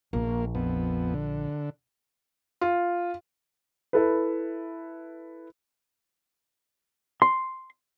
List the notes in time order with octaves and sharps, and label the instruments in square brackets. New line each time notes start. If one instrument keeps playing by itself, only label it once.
[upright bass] A#1 [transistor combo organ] A#3
[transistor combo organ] F2 B3
D3
[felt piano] F4
[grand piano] E4 A4 B4
[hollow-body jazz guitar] C6